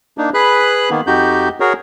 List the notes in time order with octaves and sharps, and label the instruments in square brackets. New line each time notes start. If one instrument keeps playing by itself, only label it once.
[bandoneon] A#3 D4 D#4
G#4 B4 B5 F#6
D#3 A#3 B3
F2 D#4 F#4 G4 G6
F#4 G#4 A#4 C#5